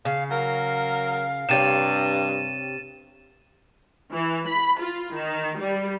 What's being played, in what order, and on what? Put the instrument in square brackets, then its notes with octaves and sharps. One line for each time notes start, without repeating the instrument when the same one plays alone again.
[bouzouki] C#3 [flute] F5
[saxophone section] F#3 A#4 [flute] F5
[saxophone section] G2 [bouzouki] C3 G4 C#5 [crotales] A6 D#7 E7
[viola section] E3
B5
F4
D#3
G3